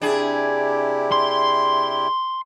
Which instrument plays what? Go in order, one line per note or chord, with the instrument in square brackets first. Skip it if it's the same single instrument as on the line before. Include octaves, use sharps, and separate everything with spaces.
[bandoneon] C3 E4 G4 [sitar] D4 G#4
[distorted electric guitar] C6